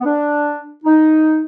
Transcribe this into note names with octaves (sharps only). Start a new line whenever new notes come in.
B3
D4
D#4